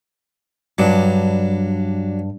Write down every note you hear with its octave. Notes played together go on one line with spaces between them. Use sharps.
G2 F#3 D4